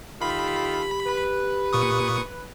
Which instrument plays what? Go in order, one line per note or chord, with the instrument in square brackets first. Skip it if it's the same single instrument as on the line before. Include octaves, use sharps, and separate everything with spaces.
[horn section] D#3 F4 A4 [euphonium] G4 [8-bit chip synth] B5
[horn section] B4
[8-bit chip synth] A#2 C#6 D#6